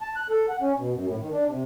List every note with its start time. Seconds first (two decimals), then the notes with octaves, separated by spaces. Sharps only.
0.01 A5
0.16 F#6
0.30 A4
0.49 F#5
0.61 C#4
0.77 B2
0.94 F#2
1.07 A2
1.21 D#3
1.33 D4
1.48 C3